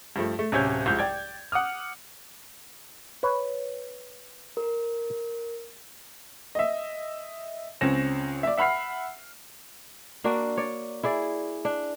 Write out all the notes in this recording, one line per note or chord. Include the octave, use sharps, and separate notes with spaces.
G2 F3 A3
A3
D1 C3 C#4 C#5 G6
C2 G#2 F3 G6
D5 G5 G#6
F#5 D6 D#6 F6
B4 C#5
A#4
D#5 E5
C#2 C4 C#4 A#6 E7
D5 E5
E5 F#5 B5 F6 C7
A#3 D4 F#4
C#5 D5
E4 G#4 D5
D4